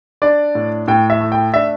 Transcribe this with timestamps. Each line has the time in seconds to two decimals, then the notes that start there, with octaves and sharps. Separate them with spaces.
0.22 D4 D5
0.55 A2
0.88 A2 G5
1.10 E5
1.21 A3
1.32 G5
1.54 D4 E5